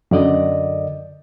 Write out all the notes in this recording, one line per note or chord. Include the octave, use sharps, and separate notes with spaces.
F#2 D3 D5 D#5